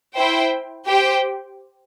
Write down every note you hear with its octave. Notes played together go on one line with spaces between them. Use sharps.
E4 C5 G5
G4 C5 G5